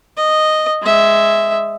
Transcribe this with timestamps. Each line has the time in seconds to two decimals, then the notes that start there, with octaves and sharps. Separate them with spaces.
0.17 D#5
0.83 G#3 E5